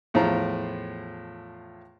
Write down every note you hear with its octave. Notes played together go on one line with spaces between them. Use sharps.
E2 A2 F3 F4 A#5